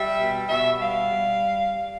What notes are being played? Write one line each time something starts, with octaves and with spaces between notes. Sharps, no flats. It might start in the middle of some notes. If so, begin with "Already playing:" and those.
Already playing: G3 E5
B2
B2 E5
G3 F5
G3